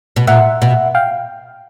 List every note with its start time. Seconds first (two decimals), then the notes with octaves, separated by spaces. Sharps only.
0.16 B2
0.27 A#2 E5 F#5
0.62 B2
0.95 F5 G5